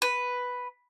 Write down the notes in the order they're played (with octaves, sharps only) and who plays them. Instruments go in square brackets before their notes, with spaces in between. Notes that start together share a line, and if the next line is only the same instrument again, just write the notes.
[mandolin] B4